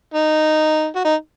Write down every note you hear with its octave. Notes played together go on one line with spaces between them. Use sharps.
D#4
F#4
D#4